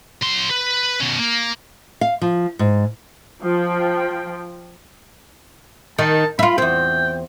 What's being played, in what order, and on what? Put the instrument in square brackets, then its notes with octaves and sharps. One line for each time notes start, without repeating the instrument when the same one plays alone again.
[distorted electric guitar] F#3 C6
B4
B2 C#4
A#3
[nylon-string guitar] F5
F3
G#2
[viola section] F3 G5
[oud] D#3 [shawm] A5
[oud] E4 F4 [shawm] B5
[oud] E2 C4 [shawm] G5